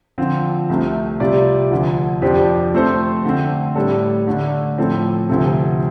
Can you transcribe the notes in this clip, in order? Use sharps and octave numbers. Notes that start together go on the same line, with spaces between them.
D3 F3 C4 F4
C2 C3 A3
C3 G3 F4 D5
D2 D3 F3
F2 F3 D4 G4 C5
F3 A3 C4 A4 C5
D3 A3 C4
A2 G3 D4 A4
D3 A3 D4
A2 F3 C4 A4
D2 C3 F3 C4 A4